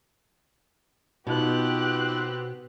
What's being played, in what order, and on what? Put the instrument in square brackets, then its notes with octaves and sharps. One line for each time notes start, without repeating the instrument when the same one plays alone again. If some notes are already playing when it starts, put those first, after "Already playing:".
[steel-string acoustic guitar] B2 [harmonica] B3 C4 [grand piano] D#4 F4 [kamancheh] G4 F#6